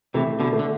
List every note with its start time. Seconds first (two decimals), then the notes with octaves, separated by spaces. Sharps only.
0.14 C3 E3 A3
0.40 B2 D3
0.53 A3
0.59 D3